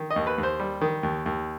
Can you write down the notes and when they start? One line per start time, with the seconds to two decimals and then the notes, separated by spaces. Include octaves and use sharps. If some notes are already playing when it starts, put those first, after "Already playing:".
Already playing: D#3
0.11 D#5
0.16 D#2
0.27 B4
0.38 D#2
0.43 C5
0.60 G3
0.81 D#3
1.03 D#2
1.26 D#2